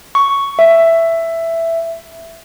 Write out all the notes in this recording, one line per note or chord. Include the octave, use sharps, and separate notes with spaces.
C#6
E5